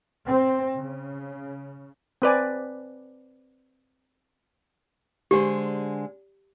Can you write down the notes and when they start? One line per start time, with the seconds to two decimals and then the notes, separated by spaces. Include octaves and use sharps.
0.25 C4
0.75 C#3
2.22 C4 B4 D5 G#5
5.31 D3 G#3 G4 C5